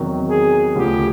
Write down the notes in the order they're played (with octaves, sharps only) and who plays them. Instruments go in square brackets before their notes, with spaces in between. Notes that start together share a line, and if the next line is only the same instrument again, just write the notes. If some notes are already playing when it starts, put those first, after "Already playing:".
Already playing: [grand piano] E2 C3 D#3 F#3
[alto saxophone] G#4
[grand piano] D2 C#3 F3 [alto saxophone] G4